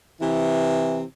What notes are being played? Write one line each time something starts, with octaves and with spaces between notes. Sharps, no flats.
C3 E3